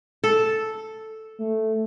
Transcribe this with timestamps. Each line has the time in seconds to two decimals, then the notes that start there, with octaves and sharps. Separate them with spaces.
0.24 A4
1.40 A3